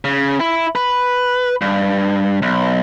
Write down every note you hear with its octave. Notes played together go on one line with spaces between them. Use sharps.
C#3
E4
B4
G2
B1